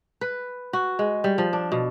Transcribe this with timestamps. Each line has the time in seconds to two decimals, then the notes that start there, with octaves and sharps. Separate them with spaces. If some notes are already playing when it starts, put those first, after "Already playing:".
0.21 B4
0.73 F#4
0.99 G#3
1.24 G3
1.38 F3
1.53 D4
1.72 B2